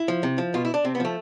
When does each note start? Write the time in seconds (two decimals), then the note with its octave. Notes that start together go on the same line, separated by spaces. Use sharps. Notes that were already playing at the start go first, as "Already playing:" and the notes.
Already playing: E4
0.08 F3
0.23 C3
0.38 F3
0.54 B2 F4
0.65 E4
0.74 D4
0.84 C3 C4
0.95 B3
1.00 F3 A3